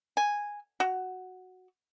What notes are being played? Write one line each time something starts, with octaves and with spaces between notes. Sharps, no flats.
G#5
F#4